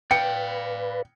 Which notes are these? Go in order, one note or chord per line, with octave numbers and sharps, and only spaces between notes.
B4 D5 F5 G5 C#7